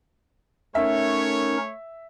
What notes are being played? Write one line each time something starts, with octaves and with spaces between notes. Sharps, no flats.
A3 C#4 D#4 A#4 C#5 E5